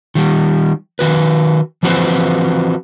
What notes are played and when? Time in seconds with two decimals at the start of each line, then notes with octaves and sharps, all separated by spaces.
0.15 D#3 G3
0.99 D#3 F#4 B4
1.83 E3 F3 C4 F#4 B4 C5